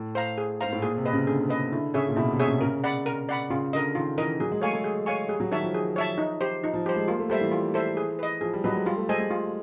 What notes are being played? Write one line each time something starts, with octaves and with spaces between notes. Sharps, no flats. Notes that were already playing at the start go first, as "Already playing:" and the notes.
Already playing: A2
C5 F5 A#5
G#4
G#2 C5 F5 A#5
A2
A#2 G#4
C3
B4 D#5
C#3
D3 G#4
B4 D#5
D3 E4
C#3 G#4 C#5 E5
A#2
B2 E4
C3
G#4 C#5 E5
C#3
C#3 A#4
D5 F#5 B5
A#4
D5 F#5 B5
C#3 F4
D3 A#4 D#5
D#3 F4
E3 A#4 D#5
F#3 G#4
G#3
A3 C#5 F5 G#5 C#6
A3
G#4
C#5 F5 G#5 C#6
G3 G#4
F#3
D#3 C#5 E5 A5
F3
G#4
C#5 E5 A5
D#4
G4 C5
F3 D#4
F3
G3 G4 C5
G#3
A#3 F4
A3
G3 A4 C5 E5
E3
F4
A4 C5 E5
G#4
B4 D#5
F3 G#4
G3
F#3 B4 D#5
G#3
G3 F4
A3
G#3 A4 C5 D#5 G#5
G#3
F4